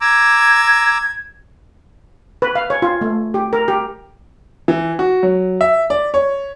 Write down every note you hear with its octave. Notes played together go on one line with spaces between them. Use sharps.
A#5 D6 E6 G#6
B4
F5
C#5
F4
A3
G4
A#4
G4
E3
F#4
F#3
E5
D5
C#5